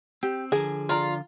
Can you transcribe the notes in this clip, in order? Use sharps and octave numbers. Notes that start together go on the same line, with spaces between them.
C4 G4
D3 F3 G#4 A#4
F4 D5 A#5